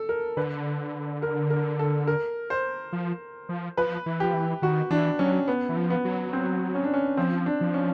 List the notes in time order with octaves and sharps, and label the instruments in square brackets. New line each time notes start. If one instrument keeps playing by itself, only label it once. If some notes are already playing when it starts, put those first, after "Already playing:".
Already playing: [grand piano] A4
A#4
[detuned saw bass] D3 [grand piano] B4
[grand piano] A#4
A#4
A4
A#4
C5
[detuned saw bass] F3
F3
[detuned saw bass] F3 [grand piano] B4
[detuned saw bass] E3
[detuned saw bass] F3 [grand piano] G4
[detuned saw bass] E3
[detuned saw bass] D#3 [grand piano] F#4
[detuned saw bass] E3 [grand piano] D4
[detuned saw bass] F#3 [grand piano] C#4
[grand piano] B3
[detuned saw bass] E3
F3
[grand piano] B3
[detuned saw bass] F#3
[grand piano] C4
C#4
D4
C#4
[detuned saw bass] F3 [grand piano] C4
[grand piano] D4
[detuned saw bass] F3
[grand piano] C#4